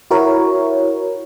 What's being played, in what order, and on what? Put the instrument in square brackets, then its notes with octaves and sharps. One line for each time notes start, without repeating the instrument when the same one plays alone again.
[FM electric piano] E4 F#4 A#4 C#5